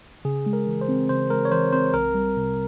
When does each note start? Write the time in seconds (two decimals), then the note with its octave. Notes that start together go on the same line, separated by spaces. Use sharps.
0.25 C#3 G#4
0.46 G#3
0.53 A#4
0.67 E3
0.81 C5
0.88 C4
1.09 C#3 C5
1.30 G#3 A#4
1.45 C#5
1.52 E3 C5
1.73 C4 C5
1.93 C2 A#4
2.14 G3
2.36 C3